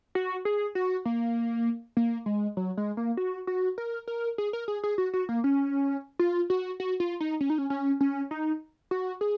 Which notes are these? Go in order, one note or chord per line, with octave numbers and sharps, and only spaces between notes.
F#4
G#4
F#4
A#3
A#3
G#3
F#3
G#3
A#3
F#4
F#4
A#4
A#4
G#4
A#4
G#4
G#4
F#4
F#4
A#3
C#4
F4
F#4
F#4
F4
D#4
C#4
D#4
C#4
C#4
C#4
D#4
F#4
G#4